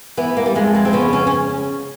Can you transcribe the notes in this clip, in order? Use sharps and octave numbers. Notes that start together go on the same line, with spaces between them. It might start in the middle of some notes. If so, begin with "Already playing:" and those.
E3 B3
A#3
G3
F2 G#3
G#3
C4
C#3 B3
C#4
C#4